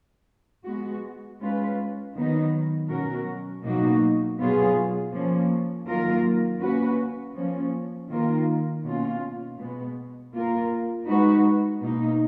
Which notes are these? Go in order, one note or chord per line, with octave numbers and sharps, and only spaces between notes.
G#3 B3 F#4
G#3 C#4 F4 B4
D#3 F#3 B3 D#4
B2 F#3 C#4 F#4 A#4
B2 F#3 A#3 D#4 F#4
B2 F#3 B3 F4 G#4
F3 A#3 C#4
D#3 F#3 A#3 F4 A#4
A#3 C#4 F#4 B4
F3 A#3 C#4
D#3 A#3 F4 A#4
B2 A#3 C#4 F4
B2 G#3 B3
A#3 F4 A#4
G#3 D#4 F#4 B4
B2 A#3 D#4